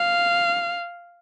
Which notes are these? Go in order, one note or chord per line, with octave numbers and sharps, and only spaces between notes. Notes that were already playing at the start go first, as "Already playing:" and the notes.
Already playing: F5